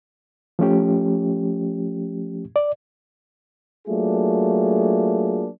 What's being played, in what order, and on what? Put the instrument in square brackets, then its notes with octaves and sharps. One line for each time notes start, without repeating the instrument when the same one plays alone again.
[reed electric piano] F3 A3 C#4 G4
D5
[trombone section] F#3 A3 A#3 D4 F4 G#4